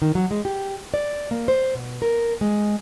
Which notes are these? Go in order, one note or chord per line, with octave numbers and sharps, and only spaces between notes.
D#3
F#3
G#3
G4
D5
A#3
C5
B2
A#4
G#3